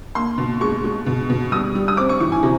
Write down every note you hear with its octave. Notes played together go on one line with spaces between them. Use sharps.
A#3 C6
B2
G#3 C#6
G#3
B2
B2
G3 D#6
G3
D#6
C4 D6
C#6
E3 C#6
G#5
C3